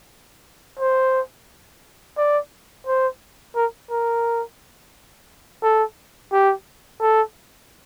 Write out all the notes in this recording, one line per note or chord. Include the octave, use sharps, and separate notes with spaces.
C5
D5
C5
A#4
A#4
A4
G4
A4